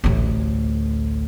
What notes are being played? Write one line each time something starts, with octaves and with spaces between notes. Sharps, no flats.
A1 D2